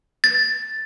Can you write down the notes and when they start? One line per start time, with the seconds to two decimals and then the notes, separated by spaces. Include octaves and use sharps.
0.24 A6